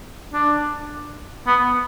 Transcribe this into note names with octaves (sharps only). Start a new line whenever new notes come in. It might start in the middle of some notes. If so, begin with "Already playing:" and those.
D4
B3